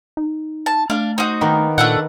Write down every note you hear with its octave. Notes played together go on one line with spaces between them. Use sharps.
D#4
A5
A3 D4 F5
D#4 F#4 C5
D#3 A#3 B3
A#2 A3 D4 F#5